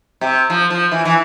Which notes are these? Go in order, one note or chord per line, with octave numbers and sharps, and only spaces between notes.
C3
F3
F3
E3
E3